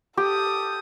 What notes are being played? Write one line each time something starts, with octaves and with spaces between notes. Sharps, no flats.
G4 A4 D#6